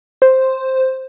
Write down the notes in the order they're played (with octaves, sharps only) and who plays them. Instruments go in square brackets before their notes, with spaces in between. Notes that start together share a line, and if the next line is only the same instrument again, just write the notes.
[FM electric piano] C5